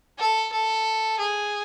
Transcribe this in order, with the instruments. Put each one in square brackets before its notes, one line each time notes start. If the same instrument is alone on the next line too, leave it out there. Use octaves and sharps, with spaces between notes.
[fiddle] A4
A4
G#4